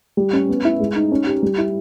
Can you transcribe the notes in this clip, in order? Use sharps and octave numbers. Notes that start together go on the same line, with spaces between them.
G3
C#4
B3
E4
G#3
D#4
C#4
G4
G3
E4